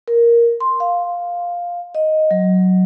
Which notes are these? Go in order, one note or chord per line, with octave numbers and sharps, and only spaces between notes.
A#4
C6
F5
D#5
F#3